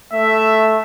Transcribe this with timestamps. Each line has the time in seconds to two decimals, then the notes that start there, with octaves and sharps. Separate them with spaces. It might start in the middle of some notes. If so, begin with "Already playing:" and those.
0.13 A3 E5